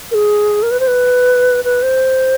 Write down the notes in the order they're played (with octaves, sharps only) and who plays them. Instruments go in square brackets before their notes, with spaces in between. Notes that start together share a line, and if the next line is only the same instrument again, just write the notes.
[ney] A#4
G#4
A#4
B4
C5
B4
B4
C5